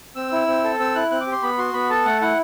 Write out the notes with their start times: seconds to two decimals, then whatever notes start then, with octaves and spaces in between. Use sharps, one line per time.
0.16 C4 E6
0.32 E4
0.47 C4
0.64 A4
0.79 C4 E6
0.95 E4 F#6
1.11 C4 F#6
1.21 D6
1.26 G4
1.32 C6
1.42 B3 B5
1.58 F#4 C6
1.74 B3 B5
1.90 A4 A5
2.05 A3 F#5
2.21 E4 F#5